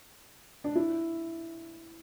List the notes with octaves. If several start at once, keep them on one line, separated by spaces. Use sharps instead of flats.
D4
E4